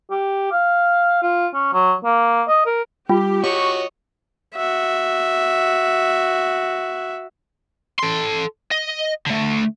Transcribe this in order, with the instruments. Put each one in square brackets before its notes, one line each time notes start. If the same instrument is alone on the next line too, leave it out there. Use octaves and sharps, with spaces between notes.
[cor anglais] G4
F5
F4
C#4
F#3
A#3
D#5
A#4
[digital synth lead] G3 [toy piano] F4 [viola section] G4
[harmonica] F#4 C#5 D#5 [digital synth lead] C#6
[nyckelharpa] F#4 E5
[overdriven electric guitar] A4 C6
D#5
D3 A3